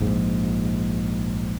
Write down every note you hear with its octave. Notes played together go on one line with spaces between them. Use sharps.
A#1 G#2